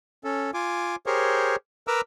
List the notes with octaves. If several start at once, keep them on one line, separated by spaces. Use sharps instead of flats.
C#4 A4
F4 G#5 D6
G4 G#4 A#4 C5 C#5
A#4 B4 A#5 D6 E6